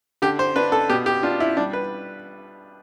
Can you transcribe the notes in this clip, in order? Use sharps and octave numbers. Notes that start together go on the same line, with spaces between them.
D3 G4
C5
D4 B4
A4
B2 G4
G4
D4 F4
E4
G3 D4
B4